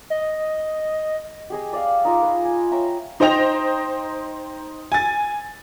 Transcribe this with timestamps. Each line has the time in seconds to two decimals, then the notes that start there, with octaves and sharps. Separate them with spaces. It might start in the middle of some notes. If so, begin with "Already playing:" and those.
0.10 D#5
1.50 G4 G#4 D#5
1.73 D5 F5
2.05 D#4 F4 D#5
2.22 B4
2.45 G#5
2.71 C#5 E5 G5 A#5
3.20 D#4 C5 D#5 G5 A#6 F7
4.92 G#5 A6